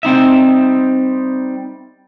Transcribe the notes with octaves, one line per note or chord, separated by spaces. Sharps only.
G3 C4 D#4 E5